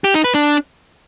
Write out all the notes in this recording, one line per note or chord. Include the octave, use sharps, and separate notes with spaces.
G4
D#4
B4
D4